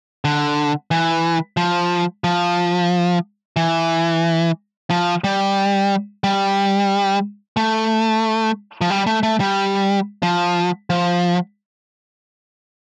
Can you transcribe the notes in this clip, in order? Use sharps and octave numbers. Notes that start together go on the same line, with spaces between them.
D3
E3
F3
F3
E3
F3
G3
G3
A3
F3
G3
A3
A3
G3
F3
F3